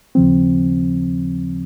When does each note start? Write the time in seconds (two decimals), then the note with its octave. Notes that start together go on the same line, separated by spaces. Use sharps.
0.15 D#2 C#3 F3 C4